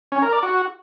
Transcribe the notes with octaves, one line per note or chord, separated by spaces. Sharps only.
C#4
A#4
D5
F#4